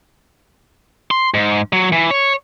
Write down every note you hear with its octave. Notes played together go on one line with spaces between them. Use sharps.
C6
G#2
F#3
E3
C#5